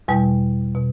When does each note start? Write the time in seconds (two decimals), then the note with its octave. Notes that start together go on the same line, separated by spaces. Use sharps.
0.08 E2 B2 G3
0.75 B2